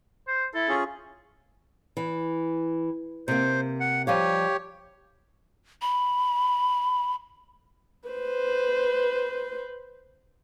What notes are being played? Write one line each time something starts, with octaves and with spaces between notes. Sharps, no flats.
C5
E4 A4
C#4 F4 G#4
E3
C3 A#3 C5
F#5
F3 G3 G4 C#5 F5
B5
B4 C5